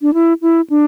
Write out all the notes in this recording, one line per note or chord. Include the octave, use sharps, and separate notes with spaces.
D4
E4
E4
D4